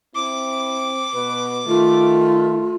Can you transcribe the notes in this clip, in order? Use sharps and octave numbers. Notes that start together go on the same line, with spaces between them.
C4 E4 D6
B2 B4
D#3 A3 F4